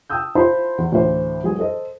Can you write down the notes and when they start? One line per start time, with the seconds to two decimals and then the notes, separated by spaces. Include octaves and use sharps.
0.10 G5 A5 D#6 E6 G6
0.35 E4 F4 C5 A5 B5 C6
0.78 E2
0.92 D2 A2 E3 C5
1.43 F#3 G#3 B3 G#4
1.59 A4 C5 D#5